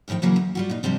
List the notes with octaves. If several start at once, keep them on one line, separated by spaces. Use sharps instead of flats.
E2 A2 D#3 F3 G5
C#3 E3 F#3 A#3 C#4
D2
G3 F4 F#4
A#2 D#4
C3 F3 G3 C4 D4